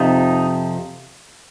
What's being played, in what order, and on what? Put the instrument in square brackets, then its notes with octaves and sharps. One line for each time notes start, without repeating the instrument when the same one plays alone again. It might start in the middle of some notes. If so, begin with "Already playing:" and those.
Already playing: [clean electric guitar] F2 C3 F3 D#4